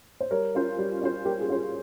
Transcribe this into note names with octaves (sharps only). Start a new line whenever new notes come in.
C5
G3 A#4 C#5
C#4 F4 C5
G3
C#4 F4 C5
G3 G4 A#4
G#4
C#4 F4 C5